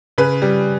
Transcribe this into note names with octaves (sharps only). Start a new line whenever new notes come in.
C#3 B4
G3